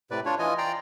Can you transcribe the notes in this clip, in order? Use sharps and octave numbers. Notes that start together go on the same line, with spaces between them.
A2 C3 B4 D5
D4 F4 C#5
E3 F4 D#5 G#5
D5 G5 A#5 C6